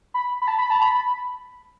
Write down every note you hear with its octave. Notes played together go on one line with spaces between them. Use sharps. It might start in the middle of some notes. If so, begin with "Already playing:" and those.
B5
B5
A5
B5
A5
B5
B5